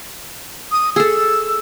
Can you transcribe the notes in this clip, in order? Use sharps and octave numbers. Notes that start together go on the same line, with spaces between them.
D#6
G#4 A4 E6